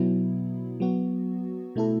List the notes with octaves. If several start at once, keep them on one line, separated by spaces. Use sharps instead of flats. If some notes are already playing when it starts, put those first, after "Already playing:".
Already playing: B2 F#3 B3 E4
F#3 B3 F#4
B2 A3 E4 A4